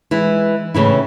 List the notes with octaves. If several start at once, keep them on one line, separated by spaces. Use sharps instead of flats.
E3 G#3 E4
A2 C#3 E3 E4